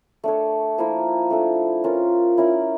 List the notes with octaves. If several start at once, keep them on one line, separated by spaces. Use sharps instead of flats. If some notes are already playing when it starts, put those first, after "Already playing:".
A3 D4 A4 C#5
F3 A#3 E4 A#4
A3 D4 A4
C#4 F4 A#4
C#4 E4 A#4 D5